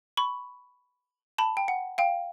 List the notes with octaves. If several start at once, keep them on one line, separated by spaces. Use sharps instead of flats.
B5 C#6
A5 B5
G5
F#5
F5 G5